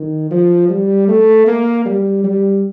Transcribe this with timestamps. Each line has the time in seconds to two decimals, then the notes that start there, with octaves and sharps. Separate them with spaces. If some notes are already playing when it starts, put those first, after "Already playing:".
Already playing: D#3
0.31 F3
0.69 G3
1.08 A3
1.46 A#3
1.85 G3
2.24 G3